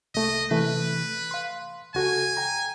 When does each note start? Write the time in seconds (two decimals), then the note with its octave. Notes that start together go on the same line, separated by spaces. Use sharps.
0.15 C2 A3 D#5
0.51 C3 E3 A3 B4
1.31 F5 C6
1.95 C#2 F#4 A4 G#5
2.37 G5 A#5